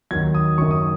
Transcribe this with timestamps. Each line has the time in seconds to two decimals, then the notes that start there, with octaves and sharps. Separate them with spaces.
0.11 D#2 D#3 F#3 G#6
0.35 D#6
0.58 F#1 F#2 D#3 F#3 C#6
0.71 D#6